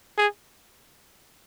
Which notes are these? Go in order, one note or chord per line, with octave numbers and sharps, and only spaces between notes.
G#4